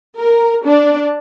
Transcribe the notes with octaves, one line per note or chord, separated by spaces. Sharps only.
A#4
D4